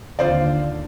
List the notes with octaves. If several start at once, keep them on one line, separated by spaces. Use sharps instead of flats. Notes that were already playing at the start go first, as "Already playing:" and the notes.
D#2 D3 F4 C5 D5